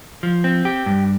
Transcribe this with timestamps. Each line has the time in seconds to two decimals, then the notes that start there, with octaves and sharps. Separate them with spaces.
0.23 F3
0.44 C4
0.65 G4
0.86 G2